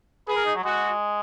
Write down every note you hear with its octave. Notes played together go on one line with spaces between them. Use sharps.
G#4 B4
A#4
D#4
F#3
G#3 F#4